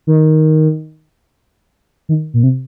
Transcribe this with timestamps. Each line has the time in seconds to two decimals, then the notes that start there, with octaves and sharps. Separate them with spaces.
0.07 D#3
2.09 D#3
2.34 A#2
2.43 C3